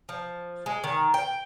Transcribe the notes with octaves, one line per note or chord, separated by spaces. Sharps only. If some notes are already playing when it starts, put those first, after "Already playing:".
F3
G#3
D#3
G5